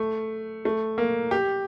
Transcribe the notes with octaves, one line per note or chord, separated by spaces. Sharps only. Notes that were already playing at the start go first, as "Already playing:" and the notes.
Already playing: A3
A3
A#3
G4